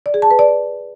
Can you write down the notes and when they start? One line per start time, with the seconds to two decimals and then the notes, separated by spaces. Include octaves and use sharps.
0.06 D5
0.14 G#4
0.22 A5
0.31 B4
0.39 D5